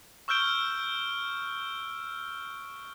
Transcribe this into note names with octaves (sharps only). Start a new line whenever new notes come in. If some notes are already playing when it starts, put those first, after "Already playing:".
C#6 E6 F6 G6 D7 G7